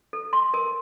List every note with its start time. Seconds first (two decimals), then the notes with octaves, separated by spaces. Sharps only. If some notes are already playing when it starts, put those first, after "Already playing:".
0.13 A4
0.33 C6
0.54 A#4